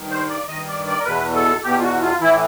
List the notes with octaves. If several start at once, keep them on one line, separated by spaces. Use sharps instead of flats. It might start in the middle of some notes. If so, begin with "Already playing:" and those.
Already playing: G2 D#3
C5
D5
G2 D#3 D#5
D5
D5
A#4
E2 B2 B4
A4
E2 B2 G4
F4
F#4
F4
A2 E3 E4